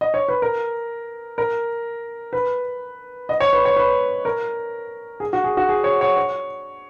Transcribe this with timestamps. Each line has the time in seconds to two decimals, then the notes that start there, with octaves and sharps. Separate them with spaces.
0.01 D#5
0.14 C#5
0.28 B4
0.42 A#4
1.38 A#4
2.33 B4
3.29 D#5
3.40 C#5
3.53 B4
3.65 C#5
3.76 B4
4.25 A#4
5.20 G#4
5.33 F#4
5.44 G#4
5.57 F#4
5.69 G#4
5.84 C#5
6.01 C#5
6.17 C#5